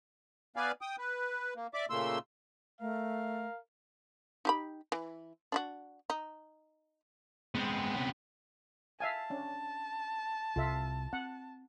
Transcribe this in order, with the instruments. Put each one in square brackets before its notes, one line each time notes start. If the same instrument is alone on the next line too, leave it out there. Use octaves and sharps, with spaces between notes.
[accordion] B3 B4 D5 F5 G#5
G5 D#6
B4
A#3
D5 E5 D6
A#2 C#3 A3 A#3 C6 E6
[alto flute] A3 [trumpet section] A#4 F5
[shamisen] D#4 G4 B5
E3
D4 E4 F#4
D#4
[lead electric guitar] G#3 [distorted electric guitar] B3 C4
[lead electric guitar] C3 C#4
[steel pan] E5 F5 G#5 [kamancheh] A5
[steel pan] C#4 D4
[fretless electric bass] C2 C3 [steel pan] F4 A4 E5
[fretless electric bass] C4 [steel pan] F#5